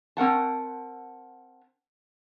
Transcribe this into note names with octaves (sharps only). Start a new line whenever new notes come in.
C4 A#4 F#5 A5